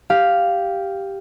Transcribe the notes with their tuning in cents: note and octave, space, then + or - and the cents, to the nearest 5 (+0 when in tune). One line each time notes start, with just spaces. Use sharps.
G4 +0 F5 +0